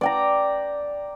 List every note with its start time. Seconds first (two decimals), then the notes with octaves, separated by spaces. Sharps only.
0.01 D5 G5 A#5